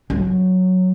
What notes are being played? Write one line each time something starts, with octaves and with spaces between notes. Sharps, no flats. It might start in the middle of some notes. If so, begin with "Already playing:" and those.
F#3